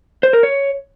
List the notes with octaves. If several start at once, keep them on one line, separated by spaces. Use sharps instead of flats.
C5
A#4
C#5